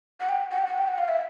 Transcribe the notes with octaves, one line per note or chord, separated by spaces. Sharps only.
F#5
G5
F#5
G5
F#5
G5
F#5
F5
E5